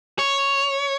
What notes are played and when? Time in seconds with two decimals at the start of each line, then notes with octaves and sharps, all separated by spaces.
0.19 C#5